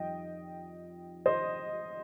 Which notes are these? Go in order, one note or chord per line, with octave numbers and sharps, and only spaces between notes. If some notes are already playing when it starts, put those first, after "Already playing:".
Already playing: F2 D#3 G3 D#5 G5
C5 D#5